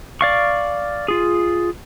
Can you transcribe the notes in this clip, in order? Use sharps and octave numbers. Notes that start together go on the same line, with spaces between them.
D5 F5 C#6
F4 G#4